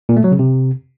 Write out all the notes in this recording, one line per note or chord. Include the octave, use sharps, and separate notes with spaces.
A#2
A3
F#3
C#3
C3